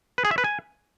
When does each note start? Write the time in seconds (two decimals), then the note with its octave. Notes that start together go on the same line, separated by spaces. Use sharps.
0.18 B4
0.25 G#4
0.31 E5
0.38 B4
0.44 G#5